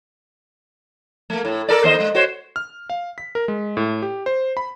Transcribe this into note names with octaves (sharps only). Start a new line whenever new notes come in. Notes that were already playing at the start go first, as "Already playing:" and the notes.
A3 A#3
A2
A4 A#4 D5
D#2 C5 D#5
G#3
F#4 C5 C#5
F6
F5
B6
A#4
G#3
A2
G4
C5
B5